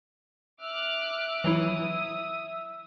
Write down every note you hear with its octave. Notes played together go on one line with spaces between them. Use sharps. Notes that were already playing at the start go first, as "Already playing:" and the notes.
E5 D6 F6 F#6
E3 F#3 E4 D#6